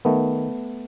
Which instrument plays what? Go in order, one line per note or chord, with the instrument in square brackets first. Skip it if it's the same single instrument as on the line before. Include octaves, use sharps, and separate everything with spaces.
[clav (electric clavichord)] D#3 A3 B3